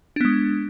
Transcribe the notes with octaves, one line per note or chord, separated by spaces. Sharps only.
G#3 B3 D4